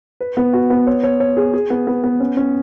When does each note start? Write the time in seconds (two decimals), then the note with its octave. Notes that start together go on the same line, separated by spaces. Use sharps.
0.21 B4
0.37 B3
0.53 F#4
0.70 B3
0.87 C#5
1.04 C#5
1.20 C#5
1.37 G#4
1.54 G#4
1.70 B3
1.87 B3
2.04 B3
2.20 C#4
2.37 C#4